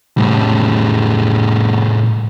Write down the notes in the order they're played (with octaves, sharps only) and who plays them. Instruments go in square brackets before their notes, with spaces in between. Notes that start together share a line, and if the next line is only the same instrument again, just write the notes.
[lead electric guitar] A2 G3